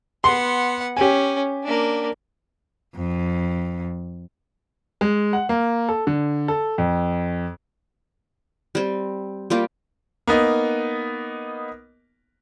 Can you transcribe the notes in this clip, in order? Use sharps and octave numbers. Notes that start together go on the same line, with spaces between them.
B3 F#5 C6
C#4 G4 G#5
A#3 D4
F2
G#3
F#5
A#3
A4
D3
A4
F2
G3 C4
G3 A#3 F4 G4
A#3 B3 D#4